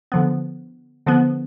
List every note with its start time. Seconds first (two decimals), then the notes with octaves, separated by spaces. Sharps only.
0.12 D3 F3 B3
1.06 D3 F3 B3